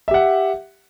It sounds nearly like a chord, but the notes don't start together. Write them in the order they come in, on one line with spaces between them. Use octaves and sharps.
E5 G4 F#5